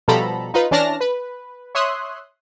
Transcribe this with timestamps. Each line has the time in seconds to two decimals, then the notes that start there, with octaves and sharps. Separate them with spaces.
0.08 B2 F3 G3 A4 A#5 B5
0.54 D#4 F4 B4
0.71 E3 C#4 D4 A5 F6 A#6
1.01 B4
1.75 C#5 E5 C6 D#6 F#6